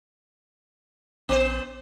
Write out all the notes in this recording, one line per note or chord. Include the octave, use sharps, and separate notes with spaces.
A#1 B3 C5